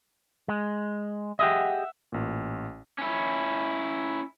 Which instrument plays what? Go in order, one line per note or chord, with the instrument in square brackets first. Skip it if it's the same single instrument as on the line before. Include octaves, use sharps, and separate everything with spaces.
[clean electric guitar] G#3
[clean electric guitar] G4 G#4 D#5 [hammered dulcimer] E5 F#5
[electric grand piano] A1 A#2
[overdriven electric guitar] C#4 E4